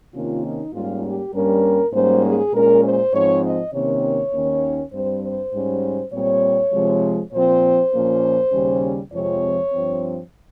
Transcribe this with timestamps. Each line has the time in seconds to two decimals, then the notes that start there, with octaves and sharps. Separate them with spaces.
0.14 C3 D#3 A#3 C#4 F4
0.44 D#4
0.74 G#2 G3 A#3 C#4 F4
1.03 G4
1.33 G2 G3 A#3 C#4 A#4
1.93 G#2 G3 A#3 C#4 C5
2.24 G#4
2.54 A#2 G#3 C#4 A#4
2.83 C5
3.13 G#2 F3 C4 C#5
3.44 D#5
3.73 C3 D#3 A#3 C#4 C#5
4.34 D#2 D#3 A#3 C#4
4.93 G2 G3 C4 C5
5.22 C5
5.54 G#2 G3 C#4
6.13 A#2 G3 C4 C#5
6.73 C3 F3 G#3
7.33 A#2 F3 C4 C5
7.93 A#2 F3 A#3 C#4
8.53 D#2 C#3 G3 C#4
9.12 F2 C3 F3 G#3 C4 C#5
9.72 G2 F3 C4